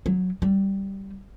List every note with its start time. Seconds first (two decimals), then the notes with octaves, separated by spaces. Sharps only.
0.06 F#3
0.42 G3